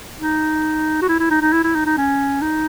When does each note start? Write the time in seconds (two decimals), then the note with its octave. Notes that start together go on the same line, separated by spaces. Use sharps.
0.19 D#4
1.02 F#4
1.08 E4
1.20 E4
1.31 D#4
1.42 D#4
1.53 E4
1.64 E4
1.75 D#4
1.86 D#4
1.97 C#4
2.41 D#4